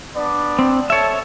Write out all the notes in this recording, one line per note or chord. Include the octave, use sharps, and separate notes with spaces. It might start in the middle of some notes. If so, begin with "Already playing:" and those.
B3 D4 D5
C4
A4 C#5 E5 A5